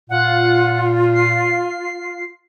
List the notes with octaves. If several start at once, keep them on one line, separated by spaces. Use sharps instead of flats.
A#2 F4 F#5
C7